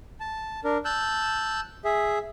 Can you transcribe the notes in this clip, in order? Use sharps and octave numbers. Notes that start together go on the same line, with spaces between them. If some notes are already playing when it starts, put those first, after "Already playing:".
A5
D4 A#4
A5 E6 F#6 G6
G#4 E5